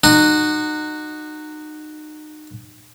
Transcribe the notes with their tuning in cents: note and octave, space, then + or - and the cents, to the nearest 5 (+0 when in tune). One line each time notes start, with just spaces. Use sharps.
D#4 -30 F#4 +0